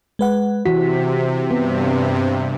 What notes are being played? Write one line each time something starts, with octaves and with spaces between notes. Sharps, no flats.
G#3 B4 F#5
C3 E3 F#4 B6
G2 C3 B3